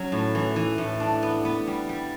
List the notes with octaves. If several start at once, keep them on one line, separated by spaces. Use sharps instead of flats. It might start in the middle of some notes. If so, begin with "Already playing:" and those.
Already playing: F#3 C#4
A2
E3
E3
A2
D4
B3
B3
G3
G3